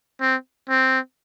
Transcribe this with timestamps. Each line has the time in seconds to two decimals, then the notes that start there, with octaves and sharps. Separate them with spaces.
0.20 C4
0.69 C4